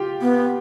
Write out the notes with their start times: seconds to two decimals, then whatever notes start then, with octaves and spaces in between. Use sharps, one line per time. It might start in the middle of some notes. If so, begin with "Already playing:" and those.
Already playing: F4 G4
0.21 B3